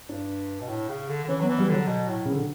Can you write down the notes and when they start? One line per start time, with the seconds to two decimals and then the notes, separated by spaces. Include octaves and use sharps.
0.09 G2 D4
0.61 B2
0.68 A2
0.89 C#3
1.08 D3
1.24 D3
1.28 E3 C#4
1.40 F#3
1.43 B3
1.49 E3
1.58 G3
1.68 D3 F#3
1.87 B2
2.08 A2
2.25 C#3
2.32 D3